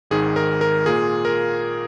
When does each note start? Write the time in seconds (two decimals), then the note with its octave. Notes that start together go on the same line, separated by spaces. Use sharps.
0.11 G#1 G#2 D#3 G#4
0.36 A#4
0.61 A#4
0.86 A#2 A#3 F4 G#4
1.25 A#4